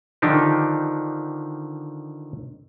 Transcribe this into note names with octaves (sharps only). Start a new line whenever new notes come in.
D3 D#3 F3 D4 D#4 G4